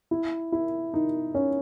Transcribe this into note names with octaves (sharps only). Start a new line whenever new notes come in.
E4
E4
D#4
C#4